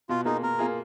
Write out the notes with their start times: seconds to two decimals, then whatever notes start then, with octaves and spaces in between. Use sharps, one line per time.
0.09 B2 F4
0.25 A#3 D#4 F4 G#4
0.43 B2 A#4
0.59 A#3 F4 G#4